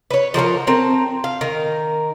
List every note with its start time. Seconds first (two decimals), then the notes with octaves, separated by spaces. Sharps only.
0.11 B4 C#5
0.34 F3 F#4 A4 A#4
0.67 C4 A#4 A5
1.24 F5
1.41 D#3 A#4